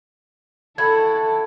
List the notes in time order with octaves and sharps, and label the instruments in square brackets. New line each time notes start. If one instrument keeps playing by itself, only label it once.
[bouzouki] E4 F#4 [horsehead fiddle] A4 [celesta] G#6